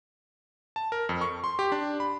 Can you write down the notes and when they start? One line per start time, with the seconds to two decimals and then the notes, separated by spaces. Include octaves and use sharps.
0.76 A5
0.92 A#4
1.09 F2
1.21 C#6
1.44 C6
1.59 G4
1.72 D4
2.00 B5